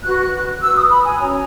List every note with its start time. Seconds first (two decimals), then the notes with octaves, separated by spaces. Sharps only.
0.03 F#4 B4 F#6
0.61 F#4 B4 E6
0.76 D#6
0.90 B5
1.05 G#5
1.19 C#4 F#4 C#5 A#5